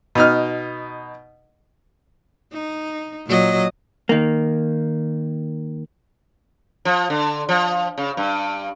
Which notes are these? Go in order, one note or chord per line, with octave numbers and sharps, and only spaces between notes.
B2 D#4 F6
D#4
A#2 F#3 D#5
D#3 A#3
F3
D3
F3
C#3
G2